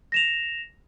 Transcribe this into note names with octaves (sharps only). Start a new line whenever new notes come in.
A#6 E7 F7